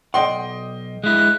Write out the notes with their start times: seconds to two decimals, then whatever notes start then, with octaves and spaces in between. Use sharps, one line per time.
0.14 B1 D5 D#5 F#5 G5 C6
1.04 G#3 E4 F#6